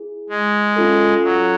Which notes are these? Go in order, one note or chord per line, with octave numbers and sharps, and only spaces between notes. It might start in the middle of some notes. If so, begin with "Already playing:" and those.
Already playing: E4 G#4
G#3
C#4 F4 A4
F#3